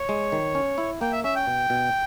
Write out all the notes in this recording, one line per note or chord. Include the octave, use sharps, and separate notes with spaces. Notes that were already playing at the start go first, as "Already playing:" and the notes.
Already playing: C#5
G#3
D#3
C#4
E4
A#3 G5
E5
C#4 E5
G5
B2
B2